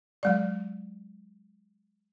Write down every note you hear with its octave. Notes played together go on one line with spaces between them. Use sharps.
F#3 G#3 D5